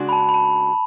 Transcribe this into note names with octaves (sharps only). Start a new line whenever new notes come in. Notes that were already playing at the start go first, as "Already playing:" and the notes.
Already playing: C#3 G#3 D4 F#4
B5
A5
B5
A5